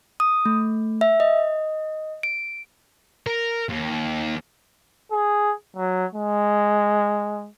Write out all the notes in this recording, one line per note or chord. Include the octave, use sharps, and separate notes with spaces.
D#6
A3
E5
D#5
D7
A#4
D#2
G#4
F#3
G#3